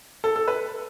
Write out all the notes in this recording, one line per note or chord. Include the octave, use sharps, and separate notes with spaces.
A4
A4
B4